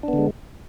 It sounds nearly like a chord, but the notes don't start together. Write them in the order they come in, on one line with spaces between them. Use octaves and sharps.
D4 B3 D3 G#3